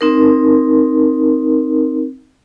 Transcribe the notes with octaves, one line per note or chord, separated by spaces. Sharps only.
C4 D#4 A#4